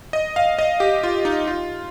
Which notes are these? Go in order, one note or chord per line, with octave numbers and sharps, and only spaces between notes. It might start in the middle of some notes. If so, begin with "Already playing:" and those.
D#5
F5
D#5
G4
F4
D#4
F4